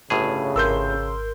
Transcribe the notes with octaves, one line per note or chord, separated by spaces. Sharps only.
G1 A2 C#3 G#4
G#1 A#4 C6 E6 G6